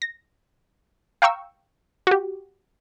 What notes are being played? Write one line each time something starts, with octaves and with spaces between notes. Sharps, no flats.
A#6
F5 G5 A#5 C#6 E6
F#4 G4